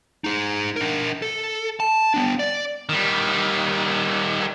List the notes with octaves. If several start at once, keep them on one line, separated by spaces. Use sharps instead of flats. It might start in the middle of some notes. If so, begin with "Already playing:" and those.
D#4 G#4
D4 A#4
A4
A5
B3 D4
D5
D#3 G3